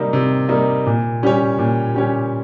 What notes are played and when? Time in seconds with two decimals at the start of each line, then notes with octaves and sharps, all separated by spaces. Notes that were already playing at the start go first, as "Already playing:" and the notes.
Already playing: C3 G3 A#3 D#4
0.13 C3
0.49 G3 A#3 D#4
0.86 A#2
1.23 G3 C#4 G4 C#5
1.59 A#2
1.95 G3 C#4 G4 C#5